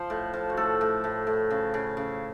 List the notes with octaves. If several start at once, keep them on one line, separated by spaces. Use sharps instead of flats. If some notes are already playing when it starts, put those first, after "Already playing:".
Already playing: F3 C5
A2
F3
F#4
A2 A4
A2
A2
A2
C#3
C#3
C#3